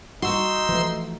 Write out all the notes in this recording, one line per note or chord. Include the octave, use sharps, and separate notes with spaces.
G3 D#4 F#4 C6 E6
E3 F3 A3